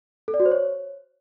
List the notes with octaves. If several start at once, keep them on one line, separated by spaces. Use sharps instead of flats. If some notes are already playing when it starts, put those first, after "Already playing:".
A4
D5
F#4
C5
C#5